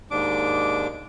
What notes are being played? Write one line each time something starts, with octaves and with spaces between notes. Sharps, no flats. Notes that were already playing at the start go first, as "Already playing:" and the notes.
D#2 G#2 D4 D6